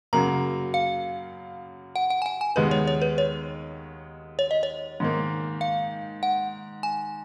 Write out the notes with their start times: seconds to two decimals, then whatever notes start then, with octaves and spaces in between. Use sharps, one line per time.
0.13 F#2 C#3 F#3 A#3 A#5
0.74 F5
1.96 F#5
2.10 F#5
2.22 G#5
2.26 F#5
2.41 G#5
2.56 D#2 D#3 G#3 B3 B4
2.71 C#5
2.87 C#5
3.02 B4
3.18 C#5
4.39 C#5
4.51 D#5
4.63 C#5
5.00 G#2 D#3 A#3
5.61 F5
6.23 F#5
6.83 G#5